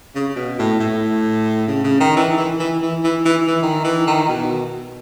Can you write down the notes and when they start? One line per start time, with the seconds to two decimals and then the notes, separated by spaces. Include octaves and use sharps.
0.15 C#3
0.36 B2
0.59 A2
0.79 A2
1.68 C#3
1.84 C#3
2.00 D#3
2.16 E3
2.37 E3
2.59 E3
2.82 E3
3.04 E3
3.25 E3
3.47 E3
3.62 D#3
3.84 E3
4.07 D#3
4.29 B2